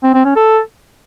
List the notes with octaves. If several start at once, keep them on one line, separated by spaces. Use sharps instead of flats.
C4
C4
C#4
A4